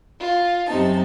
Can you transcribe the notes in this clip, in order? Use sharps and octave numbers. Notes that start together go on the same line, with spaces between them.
F4
F#2 C3 D#4 A5